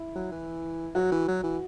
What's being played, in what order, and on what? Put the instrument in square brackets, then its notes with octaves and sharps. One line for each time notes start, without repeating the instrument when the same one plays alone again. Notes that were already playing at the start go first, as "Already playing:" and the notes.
Already playing: [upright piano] E4
[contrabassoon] F#3
E3
[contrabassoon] F#3 [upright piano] F#4
[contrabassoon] E3
F#3
E3